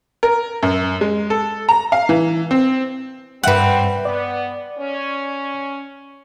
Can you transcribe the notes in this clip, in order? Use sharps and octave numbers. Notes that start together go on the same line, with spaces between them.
A#4
F#2
G#3
A4
A#5
F5
E3
C4
G2 G3 C4 B4 E5 F#5 G5
B3 D5
C#4